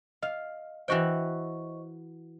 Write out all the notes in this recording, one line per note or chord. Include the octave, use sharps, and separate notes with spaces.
D#5 F5
E3 F#4 C5 D#5 G5 C#6